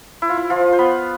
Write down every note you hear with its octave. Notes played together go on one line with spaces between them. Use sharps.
E4
F4
E4
F3 F4
C5
B3 B4